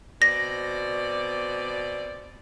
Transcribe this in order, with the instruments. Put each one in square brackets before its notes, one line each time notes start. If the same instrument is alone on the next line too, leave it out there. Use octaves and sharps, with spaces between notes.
[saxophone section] B2 C4 D5 [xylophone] A#6